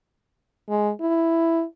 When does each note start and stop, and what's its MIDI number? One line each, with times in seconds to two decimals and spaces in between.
0.69 0.91 56
1.00 1.64 64